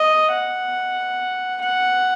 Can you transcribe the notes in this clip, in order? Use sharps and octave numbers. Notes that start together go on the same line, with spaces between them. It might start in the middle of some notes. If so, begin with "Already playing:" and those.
Already playing: D#5
F#5
F#5